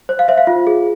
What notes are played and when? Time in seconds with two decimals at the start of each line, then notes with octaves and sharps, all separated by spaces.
0.09 C5
0.19 F5
0.28 C5 E5
0.38 F5
0.47 F4
0.67 G#4